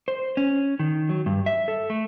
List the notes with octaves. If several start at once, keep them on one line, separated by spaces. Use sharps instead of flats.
C5
C#4
D#3
F#3
G2
E5
A4
A3